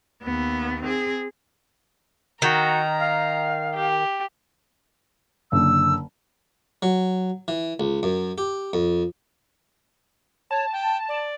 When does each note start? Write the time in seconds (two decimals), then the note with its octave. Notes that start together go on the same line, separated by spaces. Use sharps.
0.23 D#2 B3
0.82 C4 G#4
2.42 D#3 F#4 A#5
2.99 F5
3.75 G4
5.52 F#1 D3 E6
6.82 F#3
7.48 E3
7.80 C#2
8.03 F#2
8.38 G4
8.73 F2
10.51 C#5 A5
10.73 G5
11.08 D5